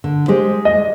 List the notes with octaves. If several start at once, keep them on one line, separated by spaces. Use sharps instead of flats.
D3
G#3 G4 C5
D#5